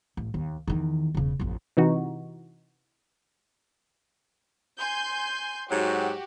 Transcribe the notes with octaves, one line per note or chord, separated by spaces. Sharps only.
A1
D#2
E2 D#3
E1 C#3
A1 F2
C3 E3 D#4 F#4
G#5 C6 G6
G#2 F#3 F#4 G4